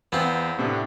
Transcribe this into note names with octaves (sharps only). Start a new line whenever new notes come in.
E2 B3 C4 F4
A2 C3 D4